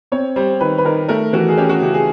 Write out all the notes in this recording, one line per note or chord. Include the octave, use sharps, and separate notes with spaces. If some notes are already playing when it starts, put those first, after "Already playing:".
C4 C#5
G3 C5
D#3 B4
B4
D#3 A#4
A3 A#4
E3 F#4
G#4
C#4 G4
F#4
C#3 G4
G#4